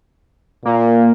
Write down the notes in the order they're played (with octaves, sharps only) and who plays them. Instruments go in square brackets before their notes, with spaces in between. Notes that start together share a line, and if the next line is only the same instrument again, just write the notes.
[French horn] A#2 [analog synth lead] A#3